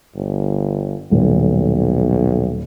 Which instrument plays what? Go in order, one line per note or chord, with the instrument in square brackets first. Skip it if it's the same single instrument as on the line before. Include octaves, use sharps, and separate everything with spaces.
[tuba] G1
[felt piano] D#1 [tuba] B1